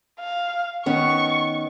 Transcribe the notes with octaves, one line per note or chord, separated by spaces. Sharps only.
F5
D#3 B3 C#4 C#6